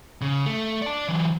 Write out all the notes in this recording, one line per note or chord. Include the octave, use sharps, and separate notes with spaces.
C#3
A3
D5 A5
E3 F#3